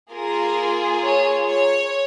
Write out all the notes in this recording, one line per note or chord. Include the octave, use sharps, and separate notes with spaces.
A#3 F4 G#4 A#4
C#5
C#5